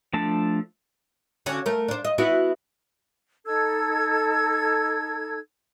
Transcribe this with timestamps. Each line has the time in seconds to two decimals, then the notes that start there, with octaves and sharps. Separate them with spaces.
0.13 F3 A3 D4 A4 A5
1.46 D3 C#4 F#4
1.66 A3 A#4
1.88 D4 C5
2.05 D#5
2.18 B3 E4 F#4
3.45 D#4 A4 E6 G#6